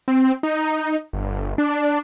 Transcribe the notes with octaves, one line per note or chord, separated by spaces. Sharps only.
C4
D#4
G1
D4